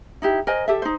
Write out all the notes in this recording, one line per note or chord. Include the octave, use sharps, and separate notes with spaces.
D#4 E4 G4
A#4 C5 D#5 G#5
G4 A4 E5
D#4 C5